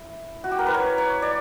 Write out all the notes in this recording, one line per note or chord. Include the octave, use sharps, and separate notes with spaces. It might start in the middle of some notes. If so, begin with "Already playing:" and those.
Already playing: E4
F#4
G4
A#4
B4
C#5
C#5
D5